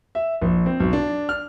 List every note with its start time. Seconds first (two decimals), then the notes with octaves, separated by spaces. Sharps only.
0.15 E5
0.41 A#1
0.66 C4
0.80 B1
0.93 D4
1.29 F6